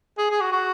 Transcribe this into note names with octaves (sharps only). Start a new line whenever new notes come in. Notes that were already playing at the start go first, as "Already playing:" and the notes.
G#4
G#4
F#4
F#4